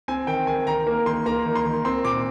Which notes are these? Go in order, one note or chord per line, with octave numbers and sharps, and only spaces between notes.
C4 G#5
D#3 G5
D#3 G#5
D#3 A#5
A#3
D#3 C6
A#3 A#5
D#3
C6
D#3
C4 C6
A#2 D6